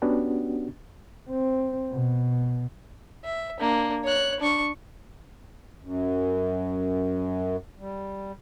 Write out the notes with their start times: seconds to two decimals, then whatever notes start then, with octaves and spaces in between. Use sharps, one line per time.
0.02 B3 C#4 D4 F#4 G4
1.30 C4
1.92 B2
3.24 E5
3.60 A#3 D4
4.04 C#5 F#6
4.40 D4 C#6
5.82 F#2
7.79 G3